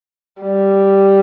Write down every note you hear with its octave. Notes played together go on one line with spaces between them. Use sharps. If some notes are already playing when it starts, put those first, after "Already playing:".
G3